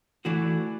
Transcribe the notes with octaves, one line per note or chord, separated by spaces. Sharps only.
E3 A3 D4 F#4